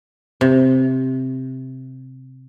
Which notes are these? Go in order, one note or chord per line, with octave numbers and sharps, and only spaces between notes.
C3